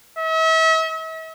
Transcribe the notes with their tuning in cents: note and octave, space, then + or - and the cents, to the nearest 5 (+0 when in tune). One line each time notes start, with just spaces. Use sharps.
E5 -40